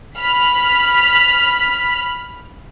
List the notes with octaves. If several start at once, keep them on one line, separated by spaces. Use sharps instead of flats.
B5 F6 B6